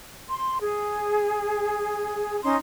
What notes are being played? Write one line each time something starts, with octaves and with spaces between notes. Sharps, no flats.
C6
G#4
C#4 D#4 C#5 C6